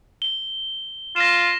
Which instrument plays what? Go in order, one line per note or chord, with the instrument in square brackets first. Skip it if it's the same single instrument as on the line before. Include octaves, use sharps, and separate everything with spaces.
[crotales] G7
[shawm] F4 [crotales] A#6 E7